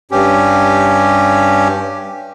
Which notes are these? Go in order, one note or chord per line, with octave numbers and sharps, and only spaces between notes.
G2 C#4 G4